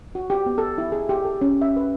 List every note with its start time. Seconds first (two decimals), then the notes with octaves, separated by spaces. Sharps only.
0.15 F#4
0.30 G4
0.46 B3
0.58 A4
0.78 E4
0.92 G#4
1.09 G4
1.25 A4
1.41 C#4
1.62 E5
1.76 B4